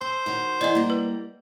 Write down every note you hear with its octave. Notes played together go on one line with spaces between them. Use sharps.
A4 C5
D#3 F#4 C#5
E3 G#4 D5 D#5 F#5
G3 A#3
B4